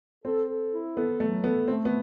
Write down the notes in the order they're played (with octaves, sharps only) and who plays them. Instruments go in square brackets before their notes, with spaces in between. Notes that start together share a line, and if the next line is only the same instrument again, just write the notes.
[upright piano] C4 [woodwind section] A4
[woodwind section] A4
E4
[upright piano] B3 [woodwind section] A4
[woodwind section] F#3 [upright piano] A3
[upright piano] B3 [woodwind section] A4
[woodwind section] A3 [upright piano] C4
[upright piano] B3